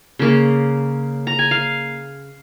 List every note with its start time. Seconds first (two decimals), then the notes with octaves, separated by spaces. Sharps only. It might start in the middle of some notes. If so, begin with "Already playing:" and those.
0.19 C#3 A#3
1.27 A#5
1.39 G#5
1.51 F5